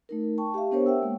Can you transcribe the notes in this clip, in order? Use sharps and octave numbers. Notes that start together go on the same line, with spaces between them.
A3 D#4 A#4
G5 A5 C#6
G4 E5 F5
B3 D4 G4 A#4 C5 C#5
E5 F#5 G5 E6
G#3 A#3